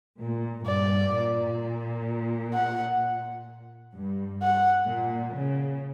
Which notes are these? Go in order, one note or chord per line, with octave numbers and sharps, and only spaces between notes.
A#2
G2 D5
A#2
F#5
G2
F#5
A#2
C#3